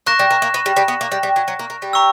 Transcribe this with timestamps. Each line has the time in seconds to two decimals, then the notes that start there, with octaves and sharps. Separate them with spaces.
0.07 A#3 C#6 F#6 A#6 E7
0.19 G3
0.30 A#3
0.42 A#3
0.54 B3
0.66 G3
0.77 G3
0.88 B3
1.01 A#3
1.12 G3
1.23 G3
1.36 F#3
1.48 F#3
1.59 A#3
1.70 A#3
1.82 G3
1.93 A#5 C#6 E6